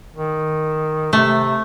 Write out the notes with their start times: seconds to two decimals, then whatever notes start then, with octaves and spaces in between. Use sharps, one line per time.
0.16 D#3
1.13 C3 A3